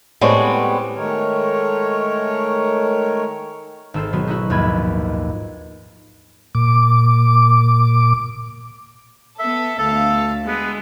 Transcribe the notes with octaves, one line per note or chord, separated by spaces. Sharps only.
A2 G3 G#3 B3 C4 C#5
D#3 G#3 A3 A#4 C#5
G#1 A4 C5
B2 D#3 F#3 B3 F#4 G#4
D#4 E4 F#4
A#1 D#2 G#2 B4 B5 G#6
A#2 D6
B3 A4 E5
D2 A4 F5
G#3 B3